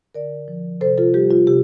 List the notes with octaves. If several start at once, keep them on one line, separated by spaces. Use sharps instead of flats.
D3 A#4 D5
F3
C3 A4 C5
F4 A4
G3 G4
F4
C3 G4